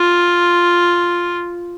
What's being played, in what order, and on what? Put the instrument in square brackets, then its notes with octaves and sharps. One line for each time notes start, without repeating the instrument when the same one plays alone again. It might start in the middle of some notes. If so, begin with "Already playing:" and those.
Already playing: [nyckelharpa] F4